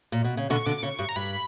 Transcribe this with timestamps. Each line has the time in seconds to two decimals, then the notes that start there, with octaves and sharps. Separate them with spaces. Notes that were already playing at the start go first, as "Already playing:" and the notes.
0.12 A#2
0.24 B2
0.37 C#3
0.50 B2 D3 C#6
0.66 B2 D3 D6
0.83 C#3 C#6
0.99 G2 C#6
1.09 A#5
1.16 G2 B5